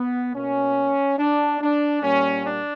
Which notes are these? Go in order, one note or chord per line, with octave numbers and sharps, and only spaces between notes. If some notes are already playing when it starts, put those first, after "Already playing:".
Already playing: B3
B2 A#3 C#4
D4
D4
A#2 G3 A#3 C#4
D4